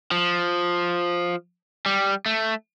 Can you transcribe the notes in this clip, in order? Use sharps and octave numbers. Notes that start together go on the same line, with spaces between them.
F3
G3
A3